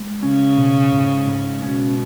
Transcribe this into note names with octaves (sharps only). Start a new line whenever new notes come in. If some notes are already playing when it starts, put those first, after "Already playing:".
Already playing: G#3
C#3 C#4
B2
G#2
G#2
B2 C#4